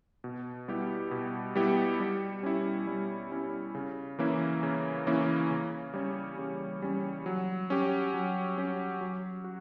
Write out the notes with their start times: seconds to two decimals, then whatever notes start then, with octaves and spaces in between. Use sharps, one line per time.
0.24 B2
0.68 G3 B3 E4 G4
1.11 B2
1.55 G3 B3 E4 G4
2.00 G3
2.43 C#4 E4
2.87 G3
3.32 C#4 E4
3.75 C#3
4.19 E3 A#3 C#4 E4
4.63 C#3
5.07 E3 A#3 C#4 E4
5.50 C#3
5.94 G3 C#4
6.38 C#3
6.82 G3 C#4
7.26 F#3
7.70 C#4 G4
8.14 F#3
8.58 C#4 G4
9.01 F#3
9.44 F#4